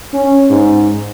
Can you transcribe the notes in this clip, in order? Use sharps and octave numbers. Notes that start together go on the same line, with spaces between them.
C#4
G#2